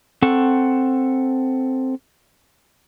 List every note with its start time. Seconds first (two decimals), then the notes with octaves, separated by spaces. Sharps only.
0.22 C4 A4 F#5 C#6